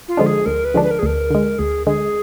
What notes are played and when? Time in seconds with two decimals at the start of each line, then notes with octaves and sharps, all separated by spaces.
0.08 F4
0.17 D3 F3 G#3 D4
0.26 G#4
0.46 D2 A#4
0.65 B4
0.74 D3 F3 G#3 D4
0.83 B4
0.91 A#4
0.99 G#4
1.03 D2 A#4
1.31 D3 G#3
1.59 D2 G#4
1.87 D3 G#3 G#4